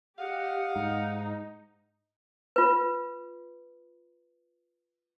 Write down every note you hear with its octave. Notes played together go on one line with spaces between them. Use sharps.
G4 D#5 F5 F#5
G#2 D#4
F4 B4